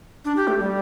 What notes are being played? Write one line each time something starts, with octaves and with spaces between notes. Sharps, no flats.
D4
G4
A3
G3